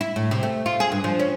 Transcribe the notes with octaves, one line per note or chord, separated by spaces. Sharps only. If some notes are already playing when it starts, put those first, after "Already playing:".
E4
A2
C3
A3
F4
G#4
G2
F3
C#4